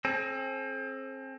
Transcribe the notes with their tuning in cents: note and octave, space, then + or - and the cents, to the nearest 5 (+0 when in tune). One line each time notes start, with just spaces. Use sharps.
C4 +30 A4 -45